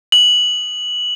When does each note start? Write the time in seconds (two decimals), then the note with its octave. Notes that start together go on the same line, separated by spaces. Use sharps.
0.12 F#7